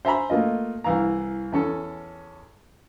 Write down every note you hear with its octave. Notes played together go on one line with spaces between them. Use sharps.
C5 E5 G#5 A#5 B5
A3 A#3 F4 D#5
C2 E3 F5 A#5
E2 C#4 A4